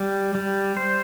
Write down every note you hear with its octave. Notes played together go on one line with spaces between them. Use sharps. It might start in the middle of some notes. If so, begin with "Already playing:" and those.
Already playing: G3
G3
C5